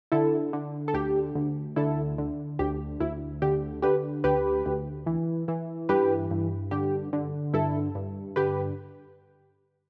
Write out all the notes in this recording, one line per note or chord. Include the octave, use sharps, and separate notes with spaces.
D3 E4 A4
D3
A4
D2 G4
D2
D3 E4 A4
D3
D2 G4
D2 E4
D3 G4
D3 G4 B4
D2 G4 B4
D2
E3
E3
G2 G4 B4
G2
D3 G4
D3
G2 E4 A4
G2
D3 G4 B4